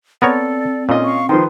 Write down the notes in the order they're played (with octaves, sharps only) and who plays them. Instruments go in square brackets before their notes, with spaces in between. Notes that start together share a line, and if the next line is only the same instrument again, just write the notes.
[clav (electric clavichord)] B3 A#4 C#5 [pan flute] C4 [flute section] A4 D5
[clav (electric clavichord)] A#2 [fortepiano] C#4 F4 D#5
[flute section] F5 C#6
[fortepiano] D#3 F3 [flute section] B4 C5 C6